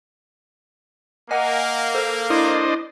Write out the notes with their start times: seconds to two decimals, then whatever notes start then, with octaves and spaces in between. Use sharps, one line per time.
1.31 A#3 D#5 F#5 G#5
1.95 A4 C5
2.30 D4 E4 C5 D#5